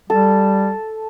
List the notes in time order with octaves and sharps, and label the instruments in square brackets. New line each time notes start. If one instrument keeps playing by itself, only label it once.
[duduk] G3 [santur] A4